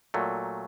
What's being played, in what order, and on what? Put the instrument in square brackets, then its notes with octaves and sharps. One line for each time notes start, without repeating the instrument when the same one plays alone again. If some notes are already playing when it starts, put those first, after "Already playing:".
[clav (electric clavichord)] A#2 F#3 A3